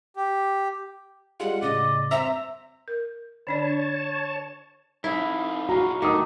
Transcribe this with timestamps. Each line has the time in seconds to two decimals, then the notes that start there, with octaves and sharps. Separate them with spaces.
0.16 G4
1.40 G3 G#3 F4 F#5
1.62 A2 C#3 D5 D#5
2.11 C4 C5 E5 A#5
2.88 A#4
3.47 D3 D4 C#5 D5 A5
5.04 F2 D#4 E4
5.69 B1 F4 F#4 A#5
6.02 D#3 A3 D6 D#6